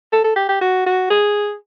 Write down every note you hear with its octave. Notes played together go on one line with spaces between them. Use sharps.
A4
A4
G4
G4
F#4
F#4
G#4